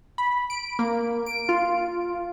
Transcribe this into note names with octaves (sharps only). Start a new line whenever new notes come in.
B5
D7
A#3
D7
F4